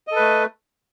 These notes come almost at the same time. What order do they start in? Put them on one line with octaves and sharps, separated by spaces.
D#5 A4 B4 A3